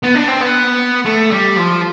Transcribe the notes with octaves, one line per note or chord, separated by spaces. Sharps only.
B3
D4
C4
B3
A3
G3
F3